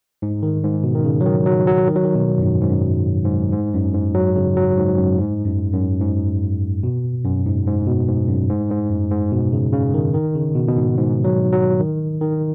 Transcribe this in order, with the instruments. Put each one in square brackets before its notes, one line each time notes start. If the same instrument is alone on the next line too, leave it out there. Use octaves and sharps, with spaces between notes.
[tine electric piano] G#2
D#3
G#2
B2
D#3
C#3
F#3
D#3
F#3
F#3
D#3
F#3
D#3
B2
F#2
G#2
G#2
F#2
G#2
G#2
F#2
G#2
F#3
C#3
F#3
G#2
F#2
G#2
F#2
F#2
G#2
B2
F#2
G#2
G#2
B2
G#2
F#2
G#2
G#2
F#2
G#2
B2
C#3
C#3
D#3
D#3
C#3
B2
B2
G#2
G#2
F#3
F#3
D#3
D#3